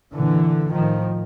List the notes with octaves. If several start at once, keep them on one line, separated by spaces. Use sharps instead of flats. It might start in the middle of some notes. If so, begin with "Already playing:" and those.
A#2 D3 E3
A2 D#3 F3